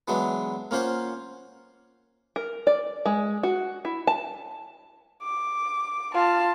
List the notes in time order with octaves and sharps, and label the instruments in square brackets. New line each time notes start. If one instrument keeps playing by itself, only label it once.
[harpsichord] E3 F#3 G#3 B3 D4
A#3 C#4 F4 C5 F#5
[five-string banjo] A#4
D5
G#3
F#4
E4
A5
[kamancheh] D6
F4 A5